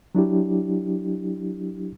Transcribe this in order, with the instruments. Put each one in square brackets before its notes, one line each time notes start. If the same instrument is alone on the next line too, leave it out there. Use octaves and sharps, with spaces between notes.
[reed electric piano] F#3 D4 E4 G4